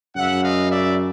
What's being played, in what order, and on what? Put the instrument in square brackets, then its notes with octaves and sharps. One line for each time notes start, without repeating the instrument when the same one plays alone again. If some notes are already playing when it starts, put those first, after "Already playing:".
[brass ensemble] F#2 C#3 F#3 E5 F#5
D#5 F5
D5 E5